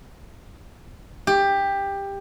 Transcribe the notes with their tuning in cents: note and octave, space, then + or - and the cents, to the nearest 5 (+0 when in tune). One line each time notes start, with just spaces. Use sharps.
G4 +15